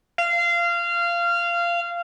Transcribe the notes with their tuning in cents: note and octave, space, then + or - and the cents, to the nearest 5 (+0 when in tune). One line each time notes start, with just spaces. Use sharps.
F5 -20